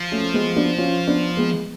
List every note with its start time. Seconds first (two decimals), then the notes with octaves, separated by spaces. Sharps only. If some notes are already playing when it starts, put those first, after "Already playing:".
Already playing: F3
0.12 A3 C#4
0.34 G#3 B3
0.56 B3 D4
0.78 C#4 F4
1.07 B3 D4
1.37 G#3 B3